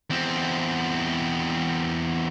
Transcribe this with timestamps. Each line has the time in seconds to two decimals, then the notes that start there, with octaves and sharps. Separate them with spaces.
0.10 E2 C4